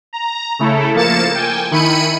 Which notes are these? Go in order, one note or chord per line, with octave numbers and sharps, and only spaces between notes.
A#5
C#3 A3 E4 A4
F3 A#3 A6 C#7 E7
G5 G#5
D#3 E4 B5 C#7 D#7